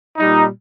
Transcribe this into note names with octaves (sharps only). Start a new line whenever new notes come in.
A#2 G3 D#4